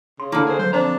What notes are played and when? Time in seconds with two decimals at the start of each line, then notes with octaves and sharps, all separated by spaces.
0.20 C#3 C6
0.32 D3 A#3 E4 B5
0.46 G#4 A#4 C5
0.59 F#3 C5
0.73 F2 D4 C5 A#5